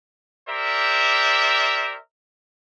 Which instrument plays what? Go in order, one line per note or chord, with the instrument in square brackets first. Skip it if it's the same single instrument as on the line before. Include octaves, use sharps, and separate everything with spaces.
[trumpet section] G4 A#4 C5 D5 E5